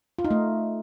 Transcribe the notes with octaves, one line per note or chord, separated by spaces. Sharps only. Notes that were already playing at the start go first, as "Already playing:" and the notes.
F4
D#4
A3